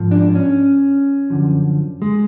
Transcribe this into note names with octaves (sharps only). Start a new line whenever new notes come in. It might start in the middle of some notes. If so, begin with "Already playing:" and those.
Already playing: G#2 F3
D4
C#4
F#2 D3 F3
G#3